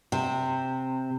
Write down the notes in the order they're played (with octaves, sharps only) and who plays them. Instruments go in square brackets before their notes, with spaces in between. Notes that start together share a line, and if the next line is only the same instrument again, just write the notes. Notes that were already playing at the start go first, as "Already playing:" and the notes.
[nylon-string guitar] C3